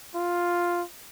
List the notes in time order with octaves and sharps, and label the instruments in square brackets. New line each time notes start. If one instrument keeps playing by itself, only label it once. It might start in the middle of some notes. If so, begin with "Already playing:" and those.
[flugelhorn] F4